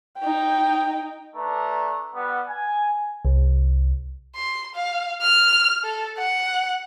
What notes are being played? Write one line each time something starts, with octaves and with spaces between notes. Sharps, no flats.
D#4 G5
A3 D4 B4 A#5
G3 B3 F#5
G#5
C2
C6
F5
F6
A4
F#5